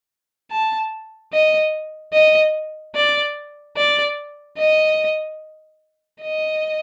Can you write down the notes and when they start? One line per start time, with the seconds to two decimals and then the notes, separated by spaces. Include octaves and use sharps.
0.51 A5
1.33 D#5
2.13 D#5
2.96 D5
3.77 D5
4.58 D#5
6.22 D#5